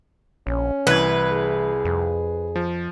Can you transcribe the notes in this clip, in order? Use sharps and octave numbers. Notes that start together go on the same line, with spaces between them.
A#1 C#4
C2 E3 E4 B4 G#6
G#4
F2
F3